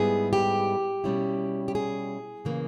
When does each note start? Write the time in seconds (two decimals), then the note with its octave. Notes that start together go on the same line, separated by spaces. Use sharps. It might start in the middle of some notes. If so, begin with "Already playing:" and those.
Already playing: G#2 G3 B3 E4 G#4
0.33 G4
1.04 B2 G3 C#4 E4
1.68 G4
1.75 G#4
2.45 C#3 E3 A#3